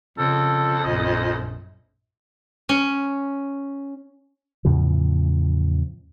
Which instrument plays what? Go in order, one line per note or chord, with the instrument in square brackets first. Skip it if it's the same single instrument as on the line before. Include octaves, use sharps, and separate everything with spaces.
[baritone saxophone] F2 [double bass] C#3 [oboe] A4
[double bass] A#1 F#2 [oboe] D#5
[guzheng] C#4
[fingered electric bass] E2 A2 C#3 F3